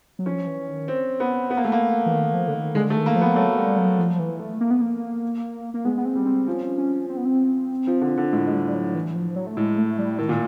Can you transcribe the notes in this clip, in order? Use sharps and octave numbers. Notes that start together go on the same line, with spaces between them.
F#3
F3 C#4
E3
D#3
C4
B3
B3
A#3
A3
A#3
E3
D#3
F3
D3
D#3
D3 G#3
A3
D#3
A#3
F3
B3
F#3 A3
G3
F#3
F3
E3
A3
A#3
B3
A#3
A#3
G#3 B3
B3
C4
G3
C4
F3 C#4
C#4
C4
B3
C4
F3
D3
D3
A2 G#3
G#3
G3
G3
F#3
E3
F3
F#3
A3
A2 G#3
A3
G3
A2 D#3
A#2